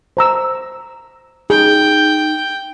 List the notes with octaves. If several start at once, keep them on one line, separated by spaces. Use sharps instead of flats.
C5 A#5 E6
D#4 G#4 G5